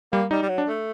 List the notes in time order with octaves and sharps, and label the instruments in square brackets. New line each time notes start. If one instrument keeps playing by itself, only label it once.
[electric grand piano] G3 [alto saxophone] A#3
[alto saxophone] G3 [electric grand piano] D#4
[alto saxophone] G3
F#3
[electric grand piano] D4
[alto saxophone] A3